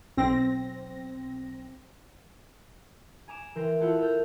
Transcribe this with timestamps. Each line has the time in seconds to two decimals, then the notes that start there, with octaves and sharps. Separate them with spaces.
0.17 B1 C4 A#6
3.28 G#5 A#5 D6 E7
3.55 E3 A#4 G5 A#5 C6 A#6
3.81 E4 F4 A4 C5 F#5 A5
3.99 A4 A#4 G6